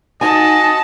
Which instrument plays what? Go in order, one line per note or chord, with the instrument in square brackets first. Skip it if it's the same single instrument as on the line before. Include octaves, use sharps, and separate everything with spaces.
[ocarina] D#4 [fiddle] F#4 A5 [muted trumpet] D#5 [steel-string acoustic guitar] G#5